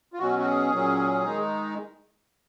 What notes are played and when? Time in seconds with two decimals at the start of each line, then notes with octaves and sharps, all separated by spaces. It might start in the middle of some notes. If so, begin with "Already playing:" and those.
0.13 F4
0.19 B2 F#3 C#4 F#4
0.39 F#4
0.45 G#4
0.71 A#2 F#3 C#4
1.25 D#3 G#3 D#4